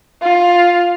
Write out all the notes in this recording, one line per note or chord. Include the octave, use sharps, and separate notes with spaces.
F4